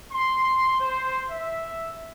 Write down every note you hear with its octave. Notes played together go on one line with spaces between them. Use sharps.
C6
C5
E5